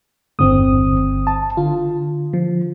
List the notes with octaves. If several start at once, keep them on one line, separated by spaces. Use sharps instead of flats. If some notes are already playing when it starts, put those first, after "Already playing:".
G1 E2 G2 D3 C4 D#6
A5
D3 F4
F3